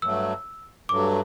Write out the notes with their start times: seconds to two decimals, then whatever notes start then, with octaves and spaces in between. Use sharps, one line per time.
0.02 G2 F#3 A3 E6
0.89 G2 F#3 A3 D6